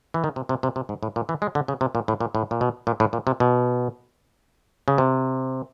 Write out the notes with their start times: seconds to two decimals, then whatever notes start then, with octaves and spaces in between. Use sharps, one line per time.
0.14 E3
0.24 D#3
0.36 C3
0.49 C3
0.63 C3
0.76 C3
0.89 G#2
1.03 A2
1.16 A#2
1.29 E3
1.42 G#3
1.55 D3
1.68 C#3
1.81 C3
1.95 A#2
2.08 A2
2.20 A#2
2.35 A2
2.51 A#2
2.61 B2
2.87 A#2
3.00 A2
3.13 A#2
3.27 C3
3.40 B2
4.88 C#3
4.98 C3